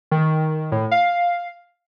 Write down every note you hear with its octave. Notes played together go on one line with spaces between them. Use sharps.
D#3
A2
F5